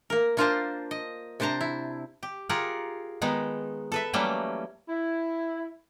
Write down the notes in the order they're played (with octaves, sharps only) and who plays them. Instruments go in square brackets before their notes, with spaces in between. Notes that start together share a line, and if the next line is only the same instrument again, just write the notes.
[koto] A#3 A#4
A#3 D4 F4 A#4 C5 A5
D#5
C3 D4 C5 A5 A#5
E4
G4
F4 G4 G#4 A#4 F#5
D#3 G#3 B3 D#4
A4 B4 E5
E3 F#3 G3 A3 A#3 C#4
[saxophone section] E4